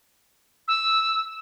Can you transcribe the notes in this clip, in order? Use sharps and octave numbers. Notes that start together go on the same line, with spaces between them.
E6